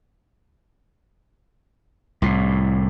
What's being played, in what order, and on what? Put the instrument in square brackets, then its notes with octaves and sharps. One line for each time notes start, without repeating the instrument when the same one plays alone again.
[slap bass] C2 A2